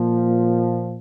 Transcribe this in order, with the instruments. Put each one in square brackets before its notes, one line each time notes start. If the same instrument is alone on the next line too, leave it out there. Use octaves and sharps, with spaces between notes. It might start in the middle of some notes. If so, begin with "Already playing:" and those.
Already playing: [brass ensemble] A#2 F3